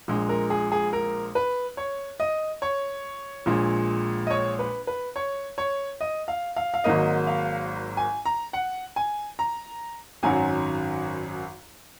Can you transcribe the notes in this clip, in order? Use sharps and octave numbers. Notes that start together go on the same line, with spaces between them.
A#1 A#2 G#3
A#4
G#4
G#4
A#4
B4
C#5
D#5
C#5
A#1 A#2 G#3
D#5
C#5
B4
B4
C#5
C#5
D#5
F5
F5
F5
G#1 G#2 F#3 A#3 D#5
F5
G#5
A#5
F#5
G#5
A#5
G#1 F#2 D#3 F#3 G#5